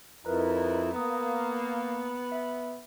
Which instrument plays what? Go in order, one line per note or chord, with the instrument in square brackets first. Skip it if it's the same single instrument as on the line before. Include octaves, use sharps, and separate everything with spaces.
[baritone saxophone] F2 [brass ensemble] D#4 E4 [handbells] A#4 B4 A#5
[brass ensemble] A#3 [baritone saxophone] B3 [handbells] A#5 D#6
[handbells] E5